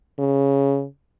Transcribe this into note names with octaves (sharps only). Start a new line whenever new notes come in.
C#3